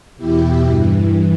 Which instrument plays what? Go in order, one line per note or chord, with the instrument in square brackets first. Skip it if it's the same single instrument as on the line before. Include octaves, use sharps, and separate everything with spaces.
[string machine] E2 B2 E4 G4
G2 E3